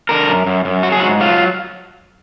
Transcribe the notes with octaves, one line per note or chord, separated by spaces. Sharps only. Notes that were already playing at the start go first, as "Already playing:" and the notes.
D3 A#4
F#2
F#2
F#2
F#3 F#4
G#4
G#2 F#4
F#3 F4